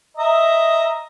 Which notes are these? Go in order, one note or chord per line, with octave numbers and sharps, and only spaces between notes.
D#5 E5 A#5